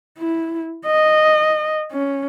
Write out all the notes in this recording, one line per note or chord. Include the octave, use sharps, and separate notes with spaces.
E4
D#5
C#4